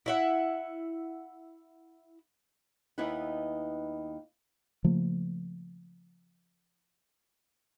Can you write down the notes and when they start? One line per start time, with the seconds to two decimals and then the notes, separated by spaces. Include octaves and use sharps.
0.06 E4 E5 F#5
2.98 D#2 B3 D#4 E4 B4 F#5
4.84 C#3 F3 A3 A#3